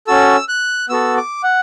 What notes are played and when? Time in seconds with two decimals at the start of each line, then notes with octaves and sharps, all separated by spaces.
0.07 C#4 F#4 A4 E6
0.49 F#6
0.89 B3 F#4 A4 E6
1.17 D6
1.43 F#5